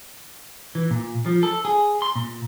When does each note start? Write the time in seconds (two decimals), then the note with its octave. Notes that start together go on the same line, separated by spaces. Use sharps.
0.75 E3
0.91 A#2
1.26 F3
1.43 A4
1.65 G#4
2.02 C6
2.16 A#2